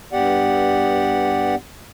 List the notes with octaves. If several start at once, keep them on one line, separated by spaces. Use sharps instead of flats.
G2 B3 G4 D5 F#5